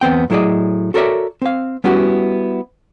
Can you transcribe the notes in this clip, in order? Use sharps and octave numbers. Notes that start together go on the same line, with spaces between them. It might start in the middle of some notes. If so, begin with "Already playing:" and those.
E2 B3 C4 G5
A2 F#3 E4 G#4 D5 D#5
F#4 A4 A#4 C#5 D5 E5
C4 F5
G3 B3 C#4 E4 F#4 G4